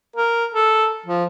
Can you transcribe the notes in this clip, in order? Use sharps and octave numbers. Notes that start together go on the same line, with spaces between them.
A#4
A4
F3